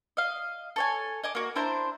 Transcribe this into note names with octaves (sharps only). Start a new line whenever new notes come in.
D#5 F5
A4 C#5 G#5
D#5 G#5 D6
A#3 F#4
D4 E4 C5 A#5